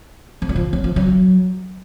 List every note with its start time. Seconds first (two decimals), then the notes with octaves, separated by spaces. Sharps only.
0.42 F3
0.49 F#3
0.56 F3
0.73 F#3
0.84 F3
0.96 F#3